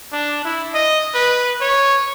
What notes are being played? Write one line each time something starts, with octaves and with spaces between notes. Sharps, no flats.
D4
E4
D#5
B4
C#5